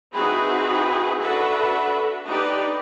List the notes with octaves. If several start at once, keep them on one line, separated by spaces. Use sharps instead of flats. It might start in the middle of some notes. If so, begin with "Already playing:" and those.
C4 D#4 E4 F#4 G#4 B4
D4 F#4 A4 B4 E5 F#5
D4 D#4 G4 B4 D5